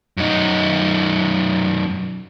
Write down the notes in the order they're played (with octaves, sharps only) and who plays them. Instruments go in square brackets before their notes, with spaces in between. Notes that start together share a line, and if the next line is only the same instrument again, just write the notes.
[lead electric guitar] F#2 D#4